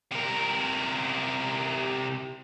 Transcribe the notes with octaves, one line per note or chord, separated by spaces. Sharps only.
C3 A#4